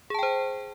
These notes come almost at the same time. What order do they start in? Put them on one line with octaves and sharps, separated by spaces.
G#4 A5 G5 C5